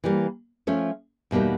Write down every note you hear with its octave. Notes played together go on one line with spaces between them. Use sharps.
E3 G3 A#3
F3 A3 C#4
E2 B2 G3 A#3 D#4